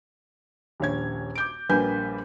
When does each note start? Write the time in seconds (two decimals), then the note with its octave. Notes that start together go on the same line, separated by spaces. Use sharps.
0.80 D#1 A#1 C#5 G#6
1.36 D6 G6 D7
1.69 A#1 G3 A#3 B4 G#5 G6